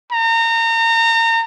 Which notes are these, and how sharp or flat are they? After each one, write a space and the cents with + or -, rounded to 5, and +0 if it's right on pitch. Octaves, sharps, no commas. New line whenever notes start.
A#5 -30